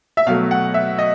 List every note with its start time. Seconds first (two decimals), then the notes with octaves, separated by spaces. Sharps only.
0.17 E5
0.27 B2 F#3 A3 F5
0.51 F#5
0.74 E5
0.99 D#5